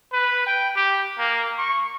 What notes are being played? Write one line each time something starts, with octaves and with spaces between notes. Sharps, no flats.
B4
G5
G4
A#3
C#6